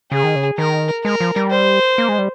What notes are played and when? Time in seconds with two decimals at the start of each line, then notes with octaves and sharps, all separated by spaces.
0.12 C#3 G#4
0.24 D#3
0.35 C#3
0.58 D#3 A#4
1.04 G#3 A#4
1.20 F3
1.36 G3
1.51 C5
1.98 A#3
2.09 G#3
2.18 G3